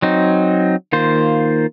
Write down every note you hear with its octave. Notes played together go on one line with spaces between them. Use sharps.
F#3 C4 D#4
D#3 A#3 F4 C5